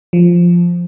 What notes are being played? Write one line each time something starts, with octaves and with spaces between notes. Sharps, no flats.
F3